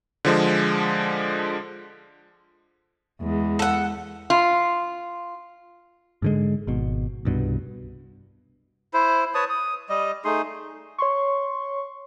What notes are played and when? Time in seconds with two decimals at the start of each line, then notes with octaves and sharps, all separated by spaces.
0.25 D3 F3 G#3
3.21 E2 G#3
3.59 A4 F#5
4.30 F4
6.22 G#2 D3 G#3
6.67 G#1 B2
7.25 C2 G2 B2
8.94 E4 C5
9.35 B4 C#5 A5 D#6
9.49 D#6
9.89 G3 D#5
10.25 A3 D#4 G#4 C6
10.98 C#5 C6 C#6